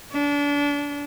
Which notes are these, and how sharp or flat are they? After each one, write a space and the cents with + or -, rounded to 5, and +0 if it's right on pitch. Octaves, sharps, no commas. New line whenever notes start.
D4 -30